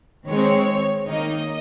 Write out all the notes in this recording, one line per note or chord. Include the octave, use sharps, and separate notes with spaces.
D#3 G#3 C4 C#5
D#3 A#3 D#4 D#5